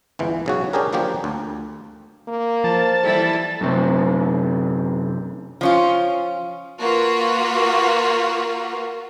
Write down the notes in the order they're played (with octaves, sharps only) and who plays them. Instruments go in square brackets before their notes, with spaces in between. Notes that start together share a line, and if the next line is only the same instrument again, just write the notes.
[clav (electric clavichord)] G1 C#2 E3
B1 C#3 F#4
C#4 D4 G4 G#4 A#4
D3 F3 F#3 A#3 G4
D2
[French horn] A#3
[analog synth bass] F3 [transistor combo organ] A5
[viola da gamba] E3 G3 E4 [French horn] A4
[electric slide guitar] F#2 C3
[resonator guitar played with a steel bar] F3 C#4 F4
[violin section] A#3 F4 F#4 B4